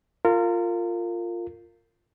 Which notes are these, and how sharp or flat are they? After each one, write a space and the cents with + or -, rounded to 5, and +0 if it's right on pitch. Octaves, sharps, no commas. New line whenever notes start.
F4 +0 A#4 -30